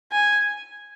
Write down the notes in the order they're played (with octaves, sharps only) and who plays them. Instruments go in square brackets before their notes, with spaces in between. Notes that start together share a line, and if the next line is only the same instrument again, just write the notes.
[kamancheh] G#5